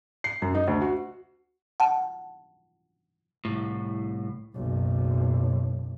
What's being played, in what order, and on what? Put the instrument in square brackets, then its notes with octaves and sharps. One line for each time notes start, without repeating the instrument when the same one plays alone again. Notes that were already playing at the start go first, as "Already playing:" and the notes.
[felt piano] C7
F#2
D#4
D2
F#4
[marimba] F#5 A5
[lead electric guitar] C2 A2
[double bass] F#1 B1